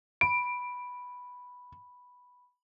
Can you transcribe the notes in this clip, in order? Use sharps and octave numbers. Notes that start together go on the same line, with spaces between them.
B5 D7